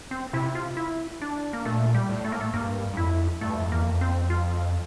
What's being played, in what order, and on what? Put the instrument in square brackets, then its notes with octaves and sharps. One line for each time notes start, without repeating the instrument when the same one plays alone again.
[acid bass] C4
[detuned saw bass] C3 [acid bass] E4
[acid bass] F4
E4
D4
A#3
[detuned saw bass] A#2 [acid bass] A3
[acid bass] G3
[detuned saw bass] A2
[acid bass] A3
A#3
A3
[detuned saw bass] G2 [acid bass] A#3
[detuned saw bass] G2
[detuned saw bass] F2 [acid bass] E4
[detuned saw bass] G2 [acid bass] A3
[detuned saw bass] F2
[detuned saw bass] E2 [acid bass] A#3
[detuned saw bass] F2
[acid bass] C4
F4